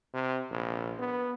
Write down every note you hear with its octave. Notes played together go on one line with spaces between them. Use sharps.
C3
A#1
B3